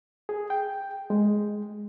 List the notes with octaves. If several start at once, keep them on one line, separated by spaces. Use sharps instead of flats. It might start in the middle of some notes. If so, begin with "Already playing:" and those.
G#4
G5
G#3